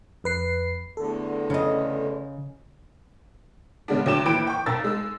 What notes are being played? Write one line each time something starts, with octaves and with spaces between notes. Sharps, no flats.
F2 B4 C7
E2 A2 D3 A4
C#3 D#5
C#3 G#3 B3 D4
D2 F#3 G5 D6 E7
A#2 E3 G5 B5 D7
G5 C#6
B1 A#4 E6 A6
G#3 E6